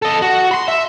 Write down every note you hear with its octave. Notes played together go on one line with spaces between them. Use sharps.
A4 D#5
F#4
B5 C6
E5